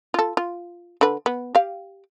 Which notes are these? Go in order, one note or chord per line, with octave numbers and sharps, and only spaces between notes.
F4 A4
F4
D3 B4
B3
G4 F5